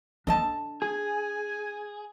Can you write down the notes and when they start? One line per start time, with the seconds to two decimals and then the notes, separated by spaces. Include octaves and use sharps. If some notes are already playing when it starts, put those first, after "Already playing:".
0.27 D4 A4 D#5 A5
0.82 G#4 G#5